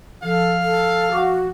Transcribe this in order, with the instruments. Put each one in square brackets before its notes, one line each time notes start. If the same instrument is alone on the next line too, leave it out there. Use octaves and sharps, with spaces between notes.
[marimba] F3 [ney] A4 [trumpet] F5
[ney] A4
[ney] F#4 [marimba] F#5 C#6 D6